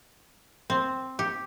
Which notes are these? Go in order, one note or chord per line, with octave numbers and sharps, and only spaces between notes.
C4
G4